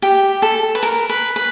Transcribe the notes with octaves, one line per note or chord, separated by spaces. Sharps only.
G4
A4
B4
A#4
B4
B4